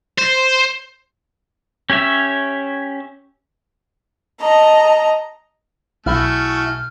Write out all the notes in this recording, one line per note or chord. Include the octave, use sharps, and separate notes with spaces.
C5
C#4 G4 C#5 E5
D#5 A5 A#5
B1 A3 E4 F#4 G#4 F6